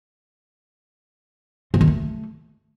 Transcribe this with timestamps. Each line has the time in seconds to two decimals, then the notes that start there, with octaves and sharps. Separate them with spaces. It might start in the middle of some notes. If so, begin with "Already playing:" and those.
1.74 C4
1.81 D#3
1.88 A3